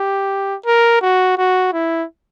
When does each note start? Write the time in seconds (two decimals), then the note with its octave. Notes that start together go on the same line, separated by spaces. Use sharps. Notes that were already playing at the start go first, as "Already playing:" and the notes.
Already playing: G4
0.66 A#4
1.01 F#4
1.38 F#4
1.73 E4